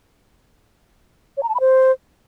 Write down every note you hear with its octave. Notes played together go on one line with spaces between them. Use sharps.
C#5
A#5
A5
B5
C5